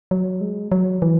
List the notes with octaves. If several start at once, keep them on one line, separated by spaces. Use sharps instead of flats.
F#3
G#3
F#3
E3